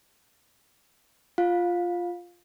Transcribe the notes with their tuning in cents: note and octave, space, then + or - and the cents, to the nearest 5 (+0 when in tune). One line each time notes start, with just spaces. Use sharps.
F4 +0 F5 +20